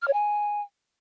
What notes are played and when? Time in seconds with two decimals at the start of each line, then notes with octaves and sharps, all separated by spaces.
0.02 F6
0.08 C#5
0.13 G#5